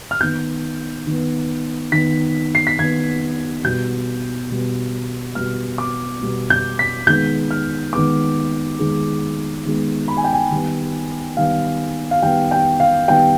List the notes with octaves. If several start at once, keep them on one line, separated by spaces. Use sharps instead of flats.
F6
D#3 B3 G6
D#3 B3
D#3 B3 B6
C7
B6
D#3 B3 G#6
B2 G3 B3 G6
B2 G3 B3
B2 G3 B3 F6
D6
B2 G3 B3
G6
B6
D#3 G#3 B3 G6
F6
D#3 G#3 B3 D6
D#3 G#3 B3
D#3 G#3 B3
B5
G#5
G5
G#5
D#3 G3 B3
D#3 G3 B3 F5
F5
D#3 G3 B3 G5
G5
F5
D#3 G3 B3 G5